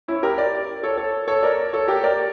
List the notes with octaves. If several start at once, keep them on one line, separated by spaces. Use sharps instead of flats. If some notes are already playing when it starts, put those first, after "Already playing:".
C#4 E4
C#5
G4 A#4
A#4 D5
A4 C#5
A4 C#5
A4 C#5
A#4 D5
A4 C#5
G4 A#4
A#4 D5